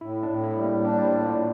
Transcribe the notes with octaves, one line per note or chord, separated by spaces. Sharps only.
A2 E4
D4
A2
E4
G3
A#3
D4 G4
D5
C5
A2
F4